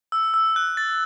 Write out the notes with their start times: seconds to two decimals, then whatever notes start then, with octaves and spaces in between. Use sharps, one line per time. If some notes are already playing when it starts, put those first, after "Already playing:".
0.12 E6
0.34 E6
0.56 F#6
0.77 A6